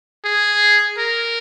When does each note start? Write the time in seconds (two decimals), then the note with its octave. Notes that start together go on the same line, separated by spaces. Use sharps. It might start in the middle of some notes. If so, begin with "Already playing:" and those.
0.25 G#4
0.98 A#4